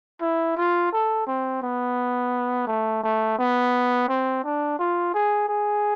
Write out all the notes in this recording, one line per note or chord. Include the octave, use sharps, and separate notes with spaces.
E4
F4
A4
C4
B3
A3
A3
B3
C4
D4
F4
G#4
G#4